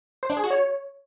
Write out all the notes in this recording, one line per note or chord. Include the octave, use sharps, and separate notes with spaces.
C5
D4
G#4
F#4
C#5